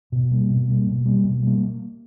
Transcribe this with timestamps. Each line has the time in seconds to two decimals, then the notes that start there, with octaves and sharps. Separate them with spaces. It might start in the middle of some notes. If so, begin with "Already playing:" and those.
0.12 B2
0.31 G3 A#3
0.50 B2
0.69 G3 A#3
0.87 B2
1.06 G3 A#3
1.24 B2
1.43 G3 A#3